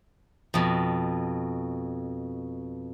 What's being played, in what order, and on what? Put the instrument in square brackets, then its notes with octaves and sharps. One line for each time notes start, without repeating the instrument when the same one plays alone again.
[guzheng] F2 B2